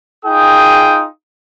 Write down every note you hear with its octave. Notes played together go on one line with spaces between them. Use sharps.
D#4 F4 G#4 G5 D#6